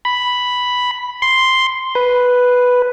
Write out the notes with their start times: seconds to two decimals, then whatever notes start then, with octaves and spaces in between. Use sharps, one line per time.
0.05 B5
1.22 C6
1.95 B4